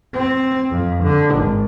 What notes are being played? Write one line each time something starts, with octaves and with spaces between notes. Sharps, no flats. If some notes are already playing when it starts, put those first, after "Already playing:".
C4
F2
D3
G#1